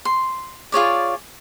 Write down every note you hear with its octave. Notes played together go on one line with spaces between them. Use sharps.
C6
F4 G#4 C#5 D5